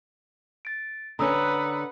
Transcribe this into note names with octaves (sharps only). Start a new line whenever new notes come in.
A6 D7
D3 C#4 B4 F#5 A#5 D#6 E6